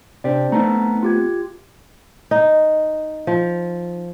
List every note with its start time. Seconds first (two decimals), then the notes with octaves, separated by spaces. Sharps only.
0.24 C3 D4 G4 C5 D5
0.52 A3 B3 C4 D#4 A5 A#5
1.03 F4 G4 G#6
2.31 D#4
3.27 F3